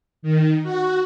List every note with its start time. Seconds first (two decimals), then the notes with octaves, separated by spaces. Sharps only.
0.22 D#3
0.63 F#4